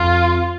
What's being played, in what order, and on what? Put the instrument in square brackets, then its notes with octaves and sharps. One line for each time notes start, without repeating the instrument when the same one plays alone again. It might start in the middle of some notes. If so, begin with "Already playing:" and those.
Already playing: [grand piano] F2 [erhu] F4